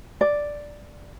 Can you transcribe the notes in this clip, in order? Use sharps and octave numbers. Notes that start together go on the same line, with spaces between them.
D5